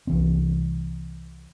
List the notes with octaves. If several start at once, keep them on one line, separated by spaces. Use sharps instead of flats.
C2 E3 C4